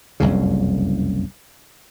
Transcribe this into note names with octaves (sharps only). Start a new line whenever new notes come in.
F#1 C2 F2 C#3